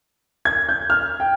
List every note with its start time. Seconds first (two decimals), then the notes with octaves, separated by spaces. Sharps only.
0.45 G#6
0.69 G6
0.90 F6
1.20 G5